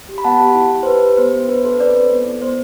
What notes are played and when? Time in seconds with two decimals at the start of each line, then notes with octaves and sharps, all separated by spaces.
0.09 G4
0.18 B5
0.24 B3 F#5 A5
0.40 G4
0.55 E4
0.71 E4
0.83 C5
0.86 G4 B4
1.02 G4
1.17 B3 C5
1.34 B3
1.48 D4 B4
1.64 A4 C5
1.79 C4 B4 D5
1.95 A4
2.11 B3
2.26 E4
2.42 B3 C5